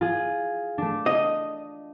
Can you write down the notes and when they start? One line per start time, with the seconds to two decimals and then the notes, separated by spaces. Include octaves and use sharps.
0.01 F4 G#4
0.78 A3 D4
1.06 D#5